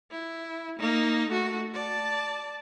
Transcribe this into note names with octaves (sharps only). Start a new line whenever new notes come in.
E4
A#3 D#4
A3 F#4
D5 A5